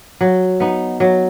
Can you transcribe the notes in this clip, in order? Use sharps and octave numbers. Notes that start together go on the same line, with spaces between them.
F#3
B3 D#4
F#3